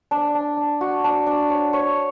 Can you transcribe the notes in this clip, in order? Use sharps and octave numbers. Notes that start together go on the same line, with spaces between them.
D4
D4
D4
F#4
D4
D4
C#5
C#5